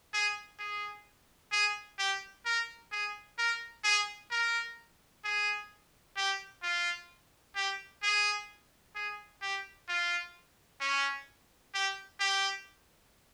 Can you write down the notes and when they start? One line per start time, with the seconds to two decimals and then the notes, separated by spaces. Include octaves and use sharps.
0.14 G#4
0.59 G#4
1.52 G#4
1.98 G4
2.46 A#4
2.92 G#4
3.38 A#4
3.84 G#4
4.31 A#4
5.24 G#4
6.17 G4
6.63 F4
7.56 G4
8.03 G#4
8.95 G#4
9.42 G4
9.89 F4
10.81 C#4
11.74 G4
12.20 G4